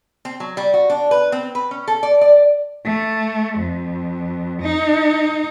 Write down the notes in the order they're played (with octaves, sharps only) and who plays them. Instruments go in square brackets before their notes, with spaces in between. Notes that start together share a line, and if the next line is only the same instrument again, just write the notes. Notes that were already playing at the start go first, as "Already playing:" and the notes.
[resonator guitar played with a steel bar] C4
F#3
G3
F#4
D4
B4
C4
B4
C#4
A4
D5
D5
[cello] A3
F2
D#4